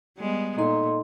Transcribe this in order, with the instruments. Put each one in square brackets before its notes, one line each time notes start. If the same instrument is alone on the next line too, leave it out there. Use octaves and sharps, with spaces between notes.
[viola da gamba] G3 G#3 B3
[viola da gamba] A#2 [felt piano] D#4 [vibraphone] A4 D#5 C6